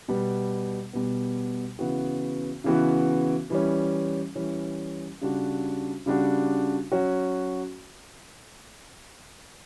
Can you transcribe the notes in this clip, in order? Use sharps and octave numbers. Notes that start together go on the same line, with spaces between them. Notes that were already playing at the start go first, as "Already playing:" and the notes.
B2 G3 B3
B2 G3 B3
C#3 E3 B3 F#4
C#3 E3 B3 F#4
E3 G3 C#4
E3 G3 C#4
C#3 G3 D4 F#4
C#3 G3 D4 F#4
F#3 C#4 F#4